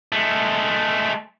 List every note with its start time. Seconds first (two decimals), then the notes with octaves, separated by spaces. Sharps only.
0.12 G#3 A3